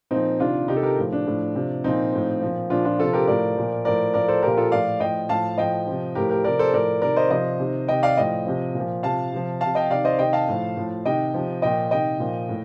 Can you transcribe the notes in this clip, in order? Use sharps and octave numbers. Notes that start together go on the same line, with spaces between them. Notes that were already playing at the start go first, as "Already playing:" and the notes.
A#2 F3 C4 D#4
C3 D#3 D4 F4
C3 D#3 D#4 G4
A4
G4 A#4
A2 F3
D4
A2 F3
C3 F3
A#2 F3 C4 D#4
A2 F3
A#2 F3
A#2 F3 D4 F4
D4 F4
C3 F3 F4 A4
G4 A#4
A2 F3 A#4 D5
A#2 F3
A2 F3 A#4 D5
A2 F3 A#4 D5
A4 C5
A#2 F3 G4 A#4
F4 A4
A2 F3 D5 F5
A2 F3 D#5 G5
A2 F3 F5 A5
A2 F3 D#5 G5
C3 F3
A2 F3 G4 A#4
G4 A#4
C3 F3 A#4 D5
A4 C5
A2 F3 A#4 D5
C3 D#3 A#4 D5
C5 D#5
C3 F3 C5 D#5
C3 D#3
C3 D#3 D#5 G5
D5 F5
A2 F3 D#5 G5
C3 F3
A#2 F3
C3 F3 F5 A5
C3 F3
C3 F3 F5 A5
D#5 G5
C3 D#3 D5 F5
C5 D#5
C3 D#3 D#5 G5
F5 A5
A2 F3
A2 F3
C3 D#3 D#5 G5
C3 F3
A#2 F3 D#5 G5
C3 D#3 D#5 G5
A#2 F3
A2